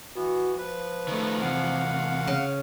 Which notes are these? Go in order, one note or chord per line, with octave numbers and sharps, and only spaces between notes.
E3 B3 F#4
F3 B4
D#3 A3
E2 C3 F5 F#5
C#3